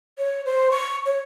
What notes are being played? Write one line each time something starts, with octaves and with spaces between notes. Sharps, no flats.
C#5
C5
C#6
C#5